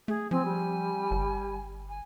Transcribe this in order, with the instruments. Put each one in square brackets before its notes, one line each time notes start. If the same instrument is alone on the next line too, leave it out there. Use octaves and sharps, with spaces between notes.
[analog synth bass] A3 [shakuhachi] G#4
[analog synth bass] F3 [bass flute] C4 [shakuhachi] G#5
[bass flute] G3
[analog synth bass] G1
[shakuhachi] G#5